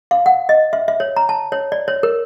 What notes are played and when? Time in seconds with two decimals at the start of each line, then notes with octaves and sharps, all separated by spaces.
0.11 F5
0.26 F#5
0.49 D#5
0.73 E5
0.88 E5
1.00 C#5
1.17 A#5
1.29 A5
1.52 C#5
1.72 D5
1.88 C#5
2.03 A#4